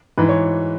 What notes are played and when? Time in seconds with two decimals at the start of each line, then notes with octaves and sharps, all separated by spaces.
0.18 G#2 E3 B4
0.29 C#5